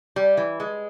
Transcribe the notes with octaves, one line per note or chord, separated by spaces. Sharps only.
G3
E3
G#3